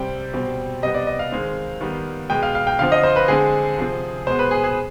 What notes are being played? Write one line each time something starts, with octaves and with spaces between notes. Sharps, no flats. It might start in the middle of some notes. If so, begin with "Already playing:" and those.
Already playing: C3 G3 C4 G5
B2 G3 C4
C3 G3 B3 D#5
D5
D#5
F5
D#3 G#3 C4
D#3 G3 B3
B2 G#3 B3 G5
F5
F5
G5
D3 F3 C4 F5
D#5
C5
B4
D3 G#3 C4 G#4
C3 F3 C4
B2 G#3 B3 C5
B4
G#4
G#4